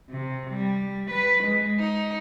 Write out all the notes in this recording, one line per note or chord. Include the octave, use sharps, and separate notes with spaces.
C3
G3
B4
G#3
D#4